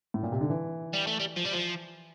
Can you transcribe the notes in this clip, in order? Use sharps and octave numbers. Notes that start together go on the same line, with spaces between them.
A2
A#2
C3
D3
E3
G3
A3
G3
F3
G3
F3